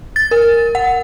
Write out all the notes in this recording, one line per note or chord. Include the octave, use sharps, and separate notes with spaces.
A6
A#4
F#5